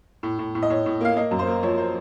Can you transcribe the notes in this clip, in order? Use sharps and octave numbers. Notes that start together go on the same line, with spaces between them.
A2
A2
A2
D#5
A2 C#5
A2
A#3 F5
A#3 D#5
F#2
C5
A#3
F3 C#5
C5